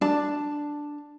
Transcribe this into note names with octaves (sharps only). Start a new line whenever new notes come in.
D4 A5